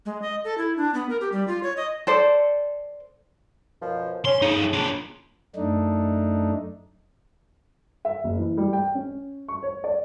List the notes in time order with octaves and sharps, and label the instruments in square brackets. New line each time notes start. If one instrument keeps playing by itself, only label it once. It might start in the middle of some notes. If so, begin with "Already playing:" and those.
[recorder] G#3
D#5
A4
E4
D4
B3
A#4
G4
G3
F4
C#5
D#5
[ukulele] A4 C5 D5
[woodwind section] F#2 B2 F3
[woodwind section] C#4 [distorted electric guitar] C6
[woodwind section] C#3 [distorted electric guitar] F3 D#4
[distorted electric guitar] D4 F4
[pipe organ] F#2 A3 D4 D#4
[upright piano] E5
F#1
E3
G3
G5
C#4
C#6
C#5
D5